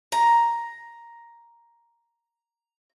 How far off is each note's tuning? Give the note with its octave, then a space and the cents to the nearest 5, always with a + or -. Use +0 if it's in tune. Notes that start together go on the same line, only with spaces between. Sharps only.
A#5 +5